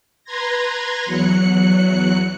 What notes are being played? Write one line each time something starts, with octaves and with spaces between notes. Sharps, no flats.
B4 A#5 C6 G#6 A#6
E2 F#3 F#6 C#7